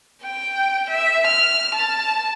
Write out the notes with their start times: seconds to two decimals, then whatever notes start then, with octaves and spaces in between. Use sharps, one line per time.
0.24 G5
0.90 E5
1.27 F6
1.75 A5